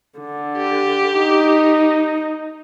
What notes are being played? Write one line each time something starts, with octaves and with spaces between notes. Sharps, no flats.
D3
G4
D#4